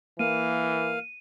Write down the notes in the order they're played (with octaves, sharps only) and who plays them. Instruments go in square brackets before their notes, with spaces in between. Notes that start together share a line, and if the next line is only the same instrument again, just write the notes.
[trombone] E3 [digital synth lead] A#3 [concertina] F5 [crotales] D#7